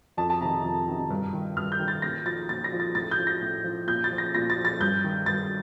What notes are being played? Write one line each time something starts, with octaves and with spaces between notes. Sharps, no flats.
F2 A5
A5
C3 D#3 A#5
F2
C3 D#3
G2
D#3
G2 F6
G6
D#3
A6
A#2 A#6
F3 A6
A#2 A6
A#6
F3
A6
A2 A6
G6
F3
A#6
A2
F3
A#2 G6
A6
F3
A#6
A#2 A#6
A6
F3
A6
G2 G6
D#3
G2 A6